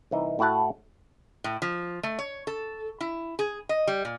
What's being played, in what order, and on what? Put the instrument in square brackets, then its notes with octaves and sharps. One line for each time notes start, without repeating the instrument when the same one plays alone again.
[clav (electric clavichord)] C2 E3 D#4
A2 E4 F#4 F#5 A5
[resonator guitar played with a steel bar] A2
F3
A3
C#5
A4
E4
G#4
D#5
G3
A#2